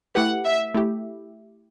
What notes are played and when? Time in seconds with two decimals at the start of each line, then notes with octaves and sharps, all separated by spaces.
0.15 A3 E4 G4 B4 F#5
0.45 E5
0.74 A3 E4 G4